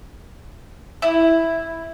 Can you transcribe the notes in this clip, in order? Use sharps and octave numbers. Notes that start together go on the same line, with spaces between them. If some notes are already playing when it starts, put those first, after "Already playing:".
E4